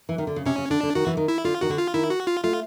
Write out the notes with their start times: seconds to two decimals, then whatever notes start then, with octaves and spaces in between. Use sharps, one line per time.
0.09 E3
0.18 D#3
0.27 D3
0.36 C#3
0.45 C3 C#4
0.58 C#3
0.70 D3 D4
0.83 D3
0.95 D#3 F#4
1.06 E3
1.17 D#3
1.28 E4
1.44 D3 F4
1.61 D#3 F#4
1.70 D3
1.78 F4
1.94 D#3 E4
2.10 F#4
2.27 F4
2.44 A3 F4